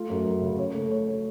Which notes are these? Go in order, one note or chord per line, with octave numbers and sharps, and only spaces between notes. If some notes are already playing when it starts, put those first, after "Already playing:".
Already playing: A3 F4
F#2
F#2
C#3
C#5
A3
C#5
C#5